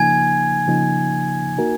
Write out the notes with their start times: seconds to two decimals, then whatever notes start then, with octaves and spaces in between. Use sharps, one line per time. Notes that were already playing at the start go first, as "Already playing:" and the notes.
Already playing: C#3 F3 A#3 D#4 G#5 G#6
0.67 C#3 F3 A#3 D#4
1.58 A#3 D#4 F#4 A#4